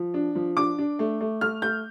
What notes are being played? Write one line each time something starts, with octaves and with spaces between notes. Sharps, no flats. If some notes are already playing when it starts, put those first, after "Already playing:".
Already playing: F3
D4
F3
D4 D6
D4
A3
A3
A3 F6
A3 G6